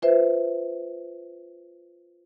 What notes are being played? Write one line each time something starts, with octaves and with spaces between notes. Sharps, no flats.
F4 B4 C5 E5